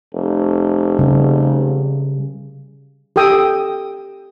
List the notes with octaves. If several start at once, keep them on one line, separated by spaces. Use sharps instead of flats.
F1
C#3 G3
G4 A4 G5 D#6 E6